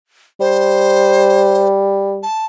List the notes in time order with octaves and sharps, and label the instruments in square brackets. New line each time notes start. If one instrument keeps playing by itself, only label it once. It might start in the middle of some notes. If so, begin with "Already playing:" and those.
[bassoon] G3 [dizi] C5
[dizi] A5